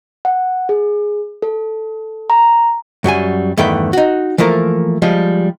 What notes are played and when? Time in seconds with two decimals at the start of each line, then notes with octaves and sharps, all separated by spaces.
0.25 F#5
0.69 G#4
1.42 A4
2.30 A#5
3.04 F#2 F#3 G3 G#5
3.57 E2 G2 D#3 A3 B4 G5
3.93 D#4 F#4
4.38 E3 F3 A3 A#3 A#4
5.02 F3 G3 G#3